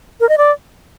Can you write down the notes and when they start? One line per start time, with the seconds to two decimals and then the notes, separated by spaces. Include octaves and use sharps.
0.20 A#4
0.29 D#5
0.38 D5